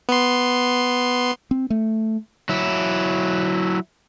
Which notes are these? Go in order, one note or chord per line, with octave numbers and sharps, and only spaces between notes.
B3 C6
C4
A3
F#3 E4